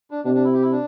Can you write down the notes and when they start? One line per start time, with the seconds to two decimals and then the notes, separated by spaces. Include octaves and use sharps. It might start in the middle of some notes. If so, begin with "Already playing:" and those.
0.11 D4
0.24 C3 D4
0.34 D4
0.44 E4
0.53 G4
0.62 E4
0.72 D4